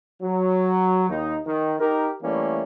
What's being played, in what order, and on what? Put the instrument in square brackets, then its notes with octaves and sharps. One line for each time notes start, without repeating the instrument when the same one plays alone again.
[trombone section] F#3
D#2 D#4
D#3
D#4 G4 A#4
E3 G3 A3 A#3 C#4